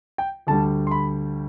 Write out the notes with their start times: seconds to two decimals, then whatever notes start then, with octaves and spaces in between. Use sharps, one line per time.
0.18 G5
0.47 D2 D3 G3 A5
0.87 C6
0.91 B5